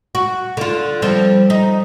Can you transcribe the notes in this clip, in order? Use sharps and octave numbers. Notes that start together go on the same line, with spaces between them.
F#4
D3 F4
F3 G3 C4
D#4